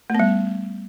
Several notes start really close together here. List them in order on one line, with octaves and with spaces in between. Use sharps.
A3 B3 G3